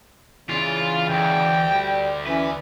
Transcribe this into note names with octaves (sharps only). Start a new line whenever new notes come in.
C#3 E3 F4 D5
D2 G5
G3
E3 C#4 B4